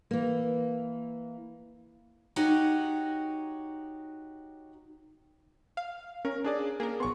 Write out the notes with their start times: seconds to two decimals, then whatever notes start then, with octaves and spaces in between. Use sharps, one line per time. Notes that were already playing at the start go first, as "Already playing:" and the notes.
0.11 E3 A#3
2.36 D#4 F#4 G4 C#5
5.77 F5
6.25 C#4 A#4
6.44 D4 G#4 D5
6.80 A#3 G#4 A#4
7.00 B1 B3 C6 C#6